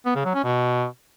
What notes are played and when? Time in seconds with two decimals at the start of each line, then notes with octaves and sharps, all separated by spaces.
0.06 B3
0.15 C#3
0.25 F#3
0.34 C#4
0.44 B2